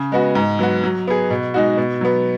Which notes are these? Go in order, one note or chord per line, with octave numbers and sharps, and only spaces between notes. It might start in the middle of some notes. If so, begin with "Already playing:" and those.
Already playing: C#3
G#3 B3 F#4
G#2
F#3 B3 F#4
F#3
B3 G#4
B2
G#3 D#4 F#4
B2
F#3 B3